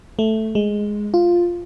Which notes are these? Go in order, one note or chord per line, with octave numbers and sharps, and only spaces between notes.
A3
G#3
F4